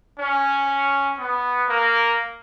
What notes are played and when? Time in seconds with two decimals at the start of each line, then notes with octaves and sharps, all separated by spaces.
0.19 C#4
1.18 B3
1.68 A#3